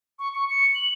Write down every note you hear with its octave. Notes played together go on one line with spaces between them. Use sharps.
C#6
C#6
C#7
F#7